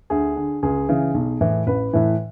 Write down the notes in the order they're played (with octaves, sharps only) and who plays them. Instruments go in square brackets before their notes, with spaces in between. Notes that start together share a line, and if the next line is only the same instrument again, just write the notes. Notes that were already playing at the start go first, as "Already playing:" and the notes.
[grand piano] D2 G#4
D3
C#2 G#4
C#3 E3
B1
A2 E3
A1 B4
A2 E3